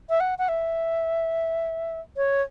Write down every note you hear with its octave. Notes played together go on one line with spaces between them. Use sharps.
E5
F#5
F#5
E5
C#5